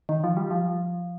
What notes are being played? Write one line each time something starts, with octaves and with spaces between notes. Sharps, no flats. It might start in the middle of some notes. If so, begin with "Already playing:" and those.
D#3
F3
G3
F3